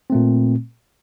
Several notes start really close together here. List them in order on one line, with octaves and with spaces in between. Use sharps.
C4 A3 A#2